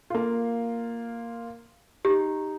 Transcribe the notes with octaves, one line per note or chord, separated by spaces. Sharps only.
A#3 F4
D#4 G4